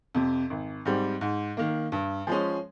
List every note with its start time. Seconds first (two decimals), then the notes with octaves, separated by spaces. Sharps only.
0.15 F2 C3
0.50 G#1
0.85 G#2 G3 C4
1.21 G#2
1.57 D#3 A#3
1.92 G2
2.27 F3 G#3 C#4